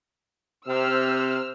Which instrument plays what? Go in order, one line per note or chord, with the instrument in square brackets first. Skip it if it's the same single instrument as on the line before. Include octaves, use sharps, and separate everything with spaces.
[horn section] C3 [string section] C5 E6 F6